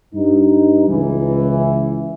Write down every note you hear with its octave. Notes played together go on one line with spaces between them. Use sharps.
G2 D#4
C#2 E3